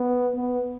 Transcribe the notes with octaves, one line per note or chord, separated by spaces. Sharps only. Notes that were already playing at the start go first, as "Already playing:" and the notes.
Already playing: B3
B3